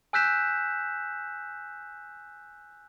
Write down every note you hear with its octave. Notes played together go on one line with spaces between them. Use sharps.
G#5 E6 F#6 G6 B6 E7